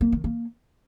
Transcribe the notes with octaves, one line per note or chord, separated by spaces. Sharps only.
A#3
D#3
A#3